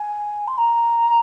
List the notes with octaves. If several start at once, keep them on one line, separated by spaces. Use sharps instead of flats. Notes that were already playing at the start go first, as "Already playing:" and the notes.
Already playing: G#5
C6
A#5